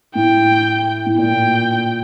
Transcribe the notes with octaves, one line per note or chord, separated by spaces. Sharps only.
A2 G5
A2
A#2 G5